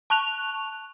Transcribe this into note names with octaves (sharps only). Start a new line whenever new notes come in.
A5 C#6 F#6 F7